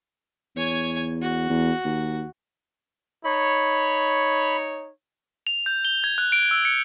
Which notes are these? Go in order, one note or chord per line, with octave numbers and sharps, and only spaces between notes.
E2 C#5 G#5
F#4
E2
D#2
D#4 C#5 B5
F7
G6
G7
G#6
F#6
D7
E6
C#7